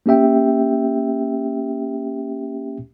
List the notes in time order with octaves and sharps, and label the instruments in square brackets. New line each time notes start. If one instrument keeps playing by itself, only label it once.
[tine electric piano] A#3 C#4 G4 E5 G5